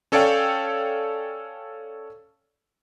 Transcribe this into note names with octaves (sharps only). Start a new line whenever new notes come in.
C#4 A4 C#5 D5 F5 G5